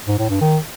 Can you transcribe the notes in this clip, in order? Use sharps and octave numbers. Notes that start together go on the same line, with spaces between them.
G#2
A2
G2
D#3